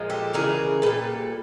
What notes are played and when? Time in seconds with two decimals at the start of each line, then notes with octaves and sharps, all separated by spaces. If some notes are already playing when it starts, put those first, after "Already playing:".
Already playing: A#2 F3 G#3
0.10 G4 A4
0.33 C#3 E3 G3 G#4 A#4
0.82 A#2 G3 A4 B4